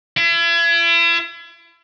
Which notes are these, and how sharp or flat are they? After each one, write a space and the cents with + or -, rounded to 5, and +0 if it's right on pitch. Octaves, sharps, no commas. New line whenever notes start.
E4 +40